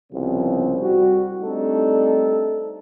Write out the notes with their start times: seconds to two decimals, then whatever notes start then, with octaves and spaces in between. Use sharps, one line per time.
0.13 C2 C#3 F3 B3 C4
0.80 C2 G3 F#4
1.42 G3 A3 C4 D4 D#4 A4